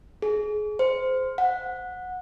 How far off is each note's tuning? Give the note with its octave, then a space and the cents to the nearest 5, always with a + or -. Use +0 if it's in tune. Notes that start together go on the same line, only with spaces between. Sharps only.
G#4 +25
C5 -15
F#5 -20